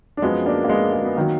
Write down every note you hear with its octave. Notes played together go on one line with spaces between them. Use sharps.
D4
F#2 F3 G#3 B3
A#3 D4
A#3
G#3 B3
G#3
B3
D#3 F#3 A#3